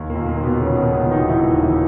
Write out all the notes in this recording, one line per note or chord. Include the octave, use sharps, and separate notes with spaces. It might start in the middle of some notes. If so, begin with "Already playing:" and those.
Already playing: D#2
A#2 A#3
D#2
A#2 A#3
D#3
B2 B3
E1 C#3 C#4
B2 B3
D#3
B2 B3
E1
D#3 D#4
D#3 E3 E4
D#2
E3 E4